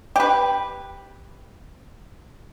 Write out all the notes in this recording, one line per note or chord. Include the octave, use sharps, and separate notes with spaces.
G4 B4